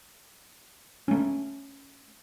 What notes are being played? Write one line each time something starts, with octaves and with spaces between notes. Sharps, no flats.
A3 C#4